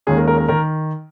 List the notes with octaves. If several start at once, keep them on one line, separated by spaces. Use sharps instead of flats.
D#2 D#3 G#3 C#4 G#4
A#4
A#4
A#4
D#3 A#4